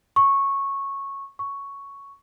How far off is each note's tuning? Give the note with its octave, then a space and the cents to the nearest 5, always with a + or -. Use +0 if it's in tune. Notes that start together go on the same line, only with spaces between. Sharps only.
C#6 -10
C#6 +5